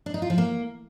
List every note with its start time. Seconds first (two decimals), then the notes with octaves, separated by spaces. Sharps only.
0.06 D4
0.14 D#4
0.22 F4
0.30 F3
0.38 A#3